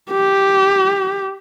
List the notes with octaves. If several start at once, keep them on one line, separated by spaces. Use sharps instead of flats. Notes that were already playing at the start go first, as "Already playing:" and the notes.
G4